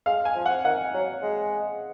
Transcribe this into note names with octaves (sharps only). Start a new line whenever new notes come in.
G#3 F5
G#5
F3
F#5
D#3 F#5
F#3
G#3